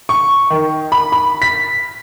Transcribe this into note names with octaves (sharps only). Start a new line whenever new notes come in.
C#6
D#3
B5
B5
B6